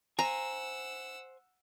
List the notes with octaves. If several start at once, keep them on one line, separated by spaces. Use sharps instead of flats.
C5 F#5 G#5 A#5 E6